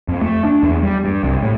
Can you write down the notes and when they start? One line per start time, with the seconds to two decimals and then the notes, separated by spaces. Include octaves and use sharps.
0.08 F2
0.21 A3
0.45 D4
0.63 E2
0.83 G3
1.05 G2
1.23 C2
1.43 A2